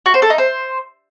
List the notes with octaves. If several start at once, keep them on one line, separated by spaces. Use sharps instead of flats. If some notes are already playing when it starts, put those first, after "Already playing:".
F#4
C5
A4
D#4
C5